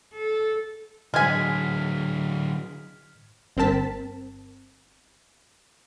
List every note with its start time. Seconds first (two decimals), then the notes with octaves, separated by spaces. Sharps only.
0.14 A4
1.14 D3 F#3 G#3 G#5 F6 G#6 B6
3.57 G1 C4 A#4 A5 B6